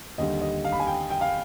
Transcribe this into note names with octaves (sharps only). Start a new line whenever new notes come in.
D#2 D3 G3 D#5
D#5
F5
B5
G#5
G5
G5
F5